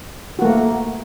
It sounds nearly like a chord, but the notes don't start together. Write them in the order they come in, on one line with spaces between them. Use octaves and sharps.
F#4 A#3 A3